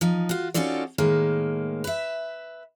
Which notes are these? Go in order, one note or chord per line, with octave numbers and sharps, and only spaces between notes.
F3 D#4
F4 F#4
C#4 D#4 F4 F#4 A4 D5
A2 D#3 G#3 A#3
B4 E5